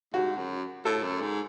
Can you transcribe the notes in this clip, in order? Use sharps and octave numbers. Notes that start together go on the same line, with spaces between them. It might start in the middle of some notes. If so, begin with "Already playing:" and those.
G#2 F#4
F#2
A2 A4
F#2
G#2